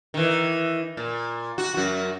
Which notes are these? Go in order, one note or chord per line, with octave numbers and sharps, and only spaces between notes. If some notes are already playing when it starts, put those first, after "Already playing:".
D#3 E3
A#2
F#4
F#2 F#4